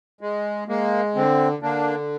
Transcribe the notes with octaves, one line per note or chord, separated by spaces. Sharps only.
G#3
G#3 A#3
D3 C4
D3 A#3 D4